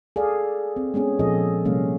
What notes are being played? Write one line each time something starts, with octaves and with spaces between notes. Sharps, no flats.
G#4 A4 D5 F5
C4
G#3 B3 C#4 G#4
A#2 F3 G#4 A4 D#5
C3 G3 A#3 C#4 F5